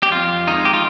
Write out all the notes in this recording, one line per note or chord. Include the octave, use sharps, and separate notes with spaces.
G4
F2 F4
D#3 G#3 D#4
G4
F4